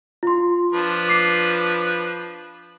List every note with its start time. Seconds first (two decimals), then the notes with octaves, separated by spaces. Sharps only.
0.23 F4 C6
0.73 F3 D4 B4
1.09 D6 C7